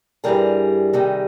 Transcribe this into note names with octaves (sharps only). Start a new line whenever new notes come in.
G2 E3 G3 G#4 A#4
C3 D#3 G3